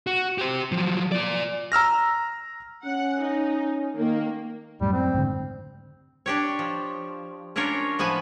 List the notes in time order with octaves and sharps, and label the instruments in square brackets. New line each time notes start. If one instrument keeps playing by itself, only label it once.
[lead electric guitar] F#4
G4 C5
F3 F#3
F4 D5
[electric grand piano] A#5 E6 F6 A#6
[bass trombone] C#4 [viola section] F#5
[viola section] D#4
[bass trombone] D#3 [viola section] A#3
[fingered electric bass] F#2 A2 [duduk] G3
[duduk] C4
[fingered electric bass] G#2 D3
[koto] D4 G4 C#5
F3
C#4 D4 F4 A#4 C#5
A2 F3 B3 B4 G#5